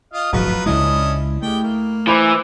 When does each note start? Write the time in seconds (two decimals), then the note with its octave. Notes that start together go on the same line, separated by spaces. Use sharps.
0.13 F4 D#5 F5
0.33 D1 G1 F3 F#3 F4 F#4 B4
0.66 C#2 C#3 G#3 C#4 D4 E4 D#5
1.42 G#3 A3 G4 G5
1.63 A#3
2.07 E3 C5 B5 D6